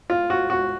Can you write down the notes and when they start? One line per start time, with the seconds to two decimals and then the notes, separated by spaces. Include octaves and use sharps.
0.10 F4
0.30 F#4
0.50 F#4